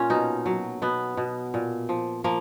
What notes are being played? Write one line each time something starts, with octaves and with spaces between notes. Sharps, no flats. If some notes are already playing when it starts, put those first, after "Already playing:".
Already playing: A#2 C#4 F4
B2 D#4
F#3
B2 B3
B2
A#2
F3
F3 A#3